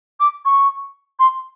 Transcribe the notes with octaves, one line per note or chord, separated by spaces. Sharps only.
D6
C#6
C6